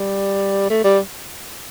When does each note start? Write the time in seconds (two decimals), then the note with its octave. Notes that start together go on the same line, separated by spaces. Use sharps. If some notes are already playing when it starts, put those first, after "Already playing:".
Already playing: G3
0.70 A3
0.84 G3